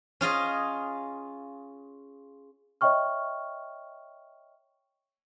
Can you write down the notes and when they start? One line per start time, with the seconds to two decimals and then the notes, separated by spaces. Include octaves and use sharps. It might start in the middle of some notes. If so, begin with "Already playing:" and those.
0.21 C#4 F4 G#4 D#5
2.81 C#5 D#5 E5 G5 C#6 F6